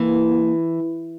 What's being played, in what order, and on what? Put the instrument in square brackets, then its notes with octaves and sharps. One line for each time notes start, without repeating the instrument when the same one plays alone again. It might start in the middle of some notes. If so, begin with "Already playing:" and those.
Already playing: [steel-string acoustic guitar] E3 [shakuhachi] A#3